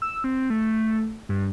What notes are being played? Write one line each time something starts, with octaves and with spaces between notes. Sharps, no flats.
E6
C4
A3
G2